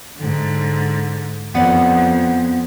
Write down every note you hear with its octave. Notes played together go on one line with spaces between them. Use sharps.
G#2 D3
F2 B3 D5 F#5